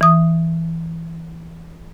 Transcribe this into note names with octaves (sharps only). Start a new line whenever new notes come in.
E3 D#6